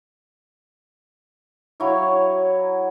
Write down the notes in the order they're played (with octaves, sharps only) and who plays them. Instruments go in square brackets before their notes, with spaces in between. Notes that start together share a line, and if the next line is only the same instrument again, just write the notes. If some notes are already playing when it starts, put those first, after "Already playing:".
[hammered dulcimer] F#3 E4 C#5 F5